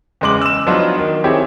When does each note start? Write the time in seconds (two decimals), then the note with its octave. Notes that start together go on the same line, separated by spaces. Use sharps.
0.21 E2 C#3 G#3 D6 F#7
0.41 E6 E7
0.66 F3 F#3 B3 D4 D#4 F4
0.98 D#3
1.24 C4 E4 G4 G#4 C#5